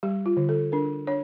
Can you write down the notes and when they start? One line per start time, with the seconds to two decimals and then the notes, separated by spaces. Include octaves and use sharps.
0.03 G3 G4
0.26 F4
0.37 D3
0.49 A4
0.72 D4 A#4
1.07 D4 C#5